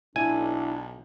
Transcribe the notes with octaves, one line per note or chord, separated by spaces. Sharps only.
B1 D4 E4 G#5